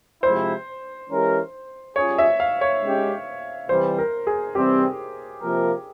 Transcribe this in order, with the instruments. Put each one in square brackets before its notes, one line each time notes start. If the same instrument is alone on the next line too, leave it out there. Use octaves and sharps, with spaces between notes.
[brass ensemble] C3 F3 G#3 E4 [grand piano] C5
[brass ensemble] E3 G#3 C#4 G4 A#4
[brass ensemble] G3 C#4 F4 G#4 [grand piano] C#5
[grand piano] E5
F5
C#5
[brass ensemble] G#3 C#4 G4
[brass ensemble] C3 E3 G3 [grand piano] C5
[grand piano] A#4
G#4
[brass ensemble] C3 E3 G3 C4 [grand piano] G4
[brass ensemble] C3 F3 A#3 F4 A#4